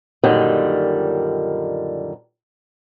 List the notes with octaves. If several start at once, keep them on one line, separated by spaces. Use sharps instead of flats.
F#2 A#2 D3 D#3 G3